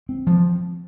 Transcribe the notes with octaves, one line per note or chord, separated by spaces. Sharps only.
C4
F3